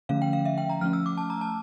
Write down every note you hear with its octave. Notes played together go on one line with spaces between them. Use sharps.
D3 F3 A3 C#4 F5
G5
F5
E5
G5
A#5
F3 A3 C#4 F6
E6
D6
A5
A#5
A5